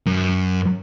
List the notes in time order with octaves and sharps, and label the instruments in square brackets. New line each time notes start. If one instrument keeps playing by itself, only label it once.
[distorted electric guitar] F#2